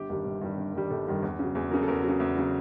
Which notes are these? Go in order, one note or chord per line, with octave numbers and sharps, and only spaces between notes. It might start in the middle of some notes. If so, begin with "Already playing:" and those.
Already playing: G1 G4
G2 D#3 G3
G1
G2 D#3 G3
G1
G2 D#3 G3
G1 A4
G2 D#3 G3
E2
C#3 F#3
E2 G#4
C#3 F#3 A#4
A4
E2 A#4
F#3
C#3
E2
C#3 F#3